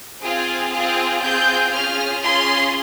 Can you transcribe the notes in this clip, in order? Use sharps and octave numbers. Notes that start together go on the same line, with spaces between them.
C4 F4 G#4
C4 F4 G#4
C4 F4 G#4 G6
C#4 F4 G#4 F6
C#4 F4 G#4 C6